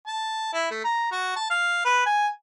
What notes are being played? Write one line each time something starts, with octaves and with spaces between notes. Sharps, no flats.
A5
E4
A3
A#5
F#4
A5
F5
B4
G#5